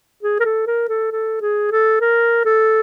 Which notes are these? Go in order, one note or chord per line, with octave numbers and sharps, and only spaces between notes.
G#4
A#4
A4
A#4
A4
A4
G#4
A4
A#4
A4